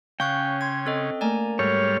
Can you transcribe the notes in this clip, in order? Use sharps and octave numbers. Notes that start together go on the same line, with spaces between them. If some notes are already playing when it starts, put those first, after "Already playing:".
C#3 C#4 F5 G5 C#6 F#6
C6 G#6
C4 A4 D#5
A3 A#3 A#4 D5 G#5 A#5
G#2 G3 A4 C#5 F6